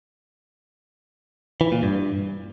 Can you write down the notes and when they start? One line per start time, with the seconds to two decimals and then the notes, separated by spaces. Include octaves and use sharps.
1.61 E3
1.72 A#2
1.83 G2